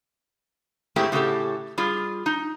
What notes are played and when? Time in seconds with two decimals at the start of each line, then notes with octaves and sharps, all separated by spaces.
0.96 G#2 G#3 A3 C4 E4 G4
1.12 A2 C#3 E4 F#4 G4 A4
1.78 G3 F4 G#4
2.26 D#4